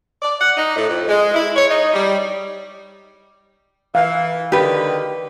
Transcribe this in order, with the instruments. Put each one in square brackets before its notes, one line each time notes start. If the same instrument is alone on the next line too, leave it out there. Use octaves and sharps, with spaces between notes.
[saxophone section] D5
F#5
D#4
A2
F2
G#3
E4
C#5
D#4
G3
[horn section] E3 [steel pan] F5
[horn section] D3 D#3 [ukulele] G4 B4